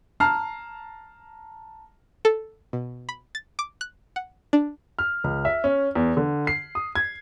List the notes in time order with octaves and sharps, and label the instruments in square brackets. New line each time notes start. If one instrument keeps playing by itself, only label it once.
[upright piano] A5 A#5 F6 C7
[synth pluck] A4
B2
B5
A6
D6
F#6
F#5
D4
[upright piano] F6
C#2
E5
C#4
E2
D3
C7
D#6
G#6